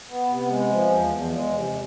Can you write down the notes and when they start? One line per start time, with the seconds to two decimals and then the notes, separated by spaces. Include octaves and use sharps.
0.08 B3
0.28 C3
0.48 G#3
0.69 F3
0.91 E2
1.11 E2
1.33 G#3
1.54 C3